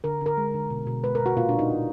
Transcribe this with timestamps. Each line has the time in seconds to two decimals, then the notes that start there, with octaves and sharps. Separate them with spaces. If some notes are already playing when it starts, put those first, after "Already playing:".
0.04 D3 A#4
0.21 D3 A#4
0.37 G#3
0.54 D3
0.70 B2
0.87 B2
1.03 G#3 B4
1.15 B2 A#4
1.26 F#4
1.37 A#2 F4
1.49 A#2 D4
1.59 D#4
1.70 A#2